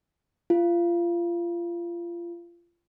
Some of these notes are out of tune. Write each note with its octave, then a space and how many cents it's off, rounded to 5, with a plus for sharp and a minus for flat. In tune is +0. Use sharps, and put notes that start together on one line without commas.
F4 -25